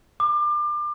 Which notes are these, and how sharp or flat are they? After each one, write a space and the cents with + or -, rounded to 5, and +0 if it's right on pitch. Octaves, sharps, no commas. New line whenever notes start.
D6 +30